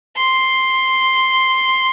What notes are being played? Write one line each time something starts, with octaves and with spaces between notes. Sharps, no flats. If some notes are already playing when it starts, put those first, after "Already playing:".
C6